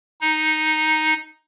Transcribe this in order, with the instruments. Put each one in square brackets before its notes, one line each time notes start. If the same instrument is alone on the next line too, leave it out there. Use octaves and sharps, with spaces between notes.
[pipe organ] D#4